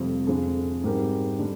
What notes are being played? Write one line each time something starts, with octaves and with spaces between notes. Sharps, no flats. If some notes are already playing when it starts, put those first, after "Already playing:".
Already playing: F1 F2 C3 G3 C4
F2 D3 G#3
G#2 G3 C4 G4 A#4
D3 G3 D4